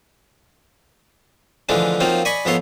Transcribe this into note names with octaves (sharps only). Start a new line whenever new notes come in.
D3 E3 F3 G#3 A3 D4
F3 F#3 A#3 C4 D#4 F4
D5 D#5 G#5 B5 C#6
G#2 F3 B3 A4 C#5 C6